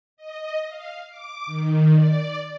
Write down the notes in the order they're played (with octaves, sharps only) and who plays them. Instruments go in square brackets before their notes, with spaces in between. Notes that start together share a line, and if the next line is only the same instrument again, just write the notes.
[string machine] D#5
F5
D6
D#3
D5